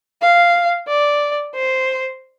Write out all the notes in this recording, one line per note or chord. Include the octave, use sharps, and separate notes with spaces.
F5
D5
C5